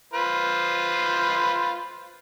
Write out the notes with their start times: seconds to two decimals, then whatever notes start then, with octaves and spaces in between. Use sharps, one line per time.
0.13 F4 B4 C5